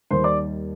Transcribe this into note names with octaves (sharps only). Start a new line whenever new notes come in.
D#2 D#3 G3 C5 C6
D5 D6